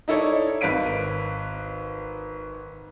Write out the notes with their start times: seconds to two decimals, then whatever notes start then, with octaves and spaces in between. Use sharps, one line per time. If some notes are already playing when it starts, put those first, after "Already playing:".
0.08 D#4 E4 A4 C#5 D5
0.61 G#1 B4 F5 B6 D7 D#7